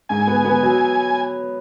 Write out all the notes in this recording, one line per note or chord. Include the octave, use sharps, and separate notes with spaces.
G#2 G#5
B3
B3
F#3